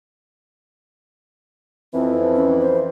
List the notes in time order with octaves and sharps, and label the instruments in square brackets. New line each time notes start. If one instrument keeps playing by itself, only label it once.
[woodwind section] F2 E3 [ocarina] C4
[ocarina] C#4
C5